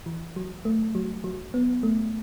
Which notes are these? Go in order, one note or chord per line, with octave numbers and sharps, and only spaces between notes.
E3
F#3
A3
F#3
F#3
B3
A3